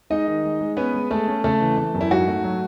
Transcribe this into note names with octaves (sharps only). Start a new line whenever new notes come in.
G#3 D#4 D#5
D#3
G#3
G#3
B3 C#4 B4
G#3
G#3 A3 A4
C#4
C#3 A3 A4
E3
A3
F#2
E4
G#2 F#4
A3
F#3